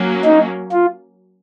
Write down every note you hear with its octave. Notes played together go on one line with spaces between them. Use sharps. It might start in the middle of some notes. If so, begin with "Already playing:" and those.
Already playing: F#3 A#3 C#4
D#4
F4